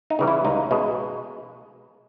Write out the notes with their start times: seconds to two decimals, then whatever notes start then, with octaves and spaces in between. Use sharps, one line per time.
0.10 D#4
0.19 C#3 E3 G3
0.27 E4
0.45 C#2 D#4
0.71 B2 G#3